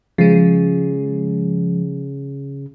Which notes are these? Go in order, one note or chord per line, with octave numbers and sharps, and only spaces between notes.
C#3 F3 G#3